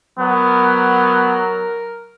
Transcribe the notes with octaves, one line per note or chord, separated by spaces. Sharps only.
F#3 B3 A#4